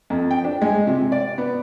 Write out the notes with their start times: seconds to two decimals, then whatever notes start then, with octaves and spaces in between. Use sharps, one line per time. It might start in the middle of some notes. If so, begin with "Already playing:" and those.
0.10 F2
0.31 G5
0.44 D4
0.62 G#3
0.87 C3
1.12 D5
1.38 B3